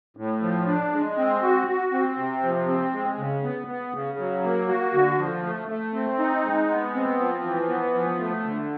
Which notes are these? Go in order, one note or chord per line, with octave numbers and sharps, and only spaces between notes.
A2
F3
D4
G#3
C4
F#4
F#4
C4
C3
F3
C4
G#3
C#3
B3
B3
C#3
F#3
A#3
F#4
D3
F3
A3
A3
C4
D#4
G#3
B3
C4
F3
E3
B3
F3
A3
D3